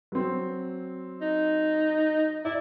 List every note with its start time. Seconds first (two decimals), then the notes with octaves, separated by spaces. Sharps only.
0.12 F#3 C4
1.22 D#4
2.45 E4 D5